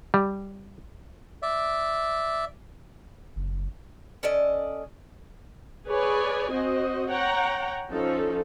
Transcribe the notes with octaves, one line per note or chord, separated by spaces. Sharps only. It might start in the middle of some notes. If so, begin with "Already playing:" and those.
G3
D5 E5
F#1
C#4 A4 D5 D#5
G#4 B4 C#5 D5 G#5
C4 F#4 C5 D#5
C#5 F#5 G5 A#5
F3 C#4 D#4 A4